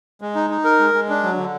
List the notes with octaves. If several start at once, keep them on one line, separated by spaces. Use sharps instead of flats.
G#3
D#4
D#4
A#4
G#3
G#3
D4
F#3
D3